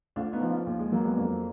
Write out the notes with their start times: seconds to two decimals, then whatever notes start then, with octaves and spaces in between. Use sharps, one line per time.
0.16 D2 D4 F4
0.33 B3 D#4
0.41 F3
0.50 D4 F4
0.67 D#2
0.79 G#3
0.92 F#3 A#3
1.05 G#3 B3
1.17 F2 A#3 D4